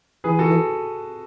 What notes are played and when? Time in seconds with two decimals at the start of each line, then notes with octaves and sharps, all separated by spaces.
0.24 E3 G#4 B4
0.39 F#4 A4
0.49 E3